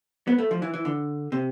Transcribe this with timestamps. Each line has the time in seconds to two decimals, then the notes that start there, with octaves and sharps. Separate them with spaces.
0.27 B3
0.38 A3
0.51 F3
0.62 E3
0.74 E3
0.85 D3
1.32 C3